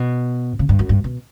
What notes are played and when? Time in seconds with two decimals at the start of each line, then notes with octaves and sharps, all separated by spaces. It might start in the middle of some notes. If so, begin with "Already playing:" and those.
Already playing: B2
0.59 C#3
0.69 G2
0.79 F#2
0.89 G2
1.04 B2